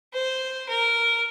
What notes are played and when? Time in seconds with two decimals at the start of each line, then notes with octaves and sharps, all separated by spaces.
0.14 C5
0.68 A#4